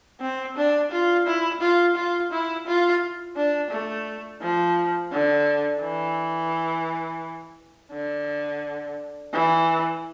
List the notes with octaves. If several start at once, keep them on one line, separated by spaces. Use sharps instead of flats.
C4
D4
F4
E4
F4
F4
E4
F4
D4
A3
F3
D3
E3
D3
E3